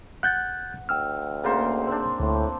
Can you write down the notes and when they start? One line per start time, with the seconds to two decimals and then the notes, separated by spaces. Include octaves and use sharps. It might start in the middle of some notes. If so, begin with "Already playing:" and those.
0.23 F#5 F#6 G6 A6
0.89 D2 G5 E6 F6
1.44 C#3 A#3 C5
1.87 C4 D4
2.20 D2 A2